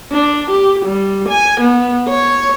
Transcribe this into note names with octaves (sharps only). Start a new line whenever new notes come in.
D4
G4
G3
G#5
B3
C#5